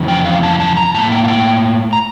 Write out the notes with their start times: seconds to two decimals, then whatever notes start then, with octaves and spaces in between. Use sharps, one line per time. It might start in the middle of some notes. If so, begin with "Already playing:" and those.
Already playing: F2 C#3 E3
0.08 G5
0.25 F5
0.43 A5
0.60 A5
0.77 A#5
0.94 A2 E3 A#3 A5
1.12 G5
1.24 F5
1.28 G5
1.93 A#5